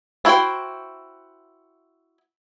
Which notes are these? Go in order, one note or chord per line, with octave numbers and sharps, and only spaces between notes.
D4 E4 F#4 C5 G5